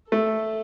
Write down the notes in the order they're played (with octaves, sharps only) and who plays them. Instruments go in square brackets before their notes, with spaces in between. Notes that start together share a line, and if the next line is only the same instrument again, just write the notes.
[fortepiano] A3 [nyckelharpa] A4